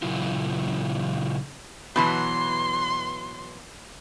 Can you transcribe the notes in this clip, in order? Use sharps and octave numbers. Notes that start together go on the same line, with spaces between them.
A#2 C#3 F#3 E4 F4
B2 E3 F#3 C6